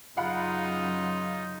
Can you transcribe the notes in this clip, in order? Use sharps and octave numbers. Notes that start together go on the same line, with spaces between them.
F#2 C#3 F#3 D#4 F4 F5 F#5 B5